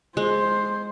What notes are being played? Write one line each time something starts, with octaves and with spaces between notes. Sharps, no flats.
G#3 C5